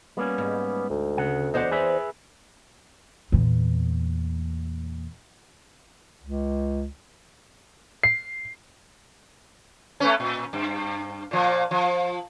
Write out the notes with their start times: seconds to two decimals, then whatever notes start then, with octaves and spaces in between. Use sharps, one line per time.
0.17 G3 A#3 B3 C#4
0.38 G#2
0.90 D2
1.18 C#3 F#5
1.54 E2 C5 D5 D#5 F#5
1.71 G#4 B4 E5
3.32 E2 A#2
6.22 C#2
8.03 C7
10.00 A3 B3 C#4
10.20 A#2
10.53 G2
11.31 A#2 F3
11.71 F3